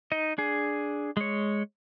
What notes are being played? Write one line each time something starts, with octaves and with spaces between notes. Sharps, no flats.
D#4 D#5
D4 G#4
G#3 C#5